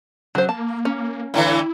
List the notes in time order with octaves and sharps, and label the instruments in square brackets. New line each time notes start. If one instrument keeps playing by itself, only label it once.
[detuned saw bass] C#3 [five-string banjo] F#3 C5
[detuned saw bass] A#3 [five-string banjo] A5
[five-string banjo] C#4
[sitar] A2 D3 E3 [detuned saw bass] E4